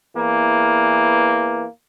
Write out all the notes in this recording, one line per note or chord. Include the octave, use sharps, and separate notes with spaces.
E2 E3 A#3